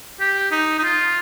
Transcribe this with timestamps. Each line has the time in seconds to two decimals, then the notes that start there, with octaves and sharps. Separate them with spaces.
0.20 G4
0.51 D#4
0.79 D#4
0.84 F4